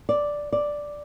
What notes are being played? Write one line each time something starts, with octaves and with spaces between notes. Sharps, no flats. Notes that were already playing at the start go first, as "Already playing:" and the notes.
D5
D5